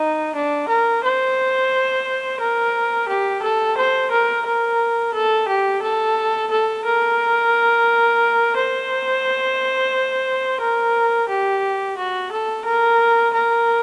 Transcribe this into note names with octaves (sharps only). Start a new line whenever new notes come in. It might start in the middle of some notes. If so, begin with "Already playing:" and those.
Already playing: D#4
D4
A#4
C5
A#4
G4
A4
C5
A#4
A#4
A4
G4
A4
A4
A#4
C5
A#4
G4
F#4
A4
A#4
A#4